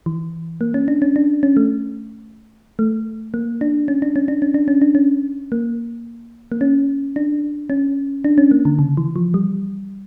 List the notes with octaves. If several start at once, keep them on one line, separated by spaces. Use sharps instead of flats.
E3
A#3
C#4
D4
C#4
D4
C#4
A3
A3
A#3
D4
C#4
D4
C#4
D4
C#4
D4
C#4
D4
C#4
A#3
A#3
C#4
D4
C#4
D4
C#4
A#3
D3
C#3
E3
F3
G3